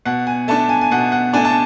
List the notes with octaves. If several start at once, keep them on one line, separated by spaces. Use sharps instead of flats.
B2 F#5
G#5
A3 D4 A5
G#5
G#5
B2 F#5
F#5
A3 D4 G#5
A5